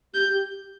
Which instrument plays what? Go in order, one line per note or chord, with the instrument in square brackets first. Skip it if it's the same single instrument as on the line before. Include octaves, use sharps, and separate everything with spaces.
[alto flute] G4 [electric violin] G6
[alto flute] G4